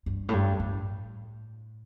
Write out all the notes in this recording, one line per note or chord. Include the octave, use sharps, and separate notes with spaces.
G2
A2
G2
A2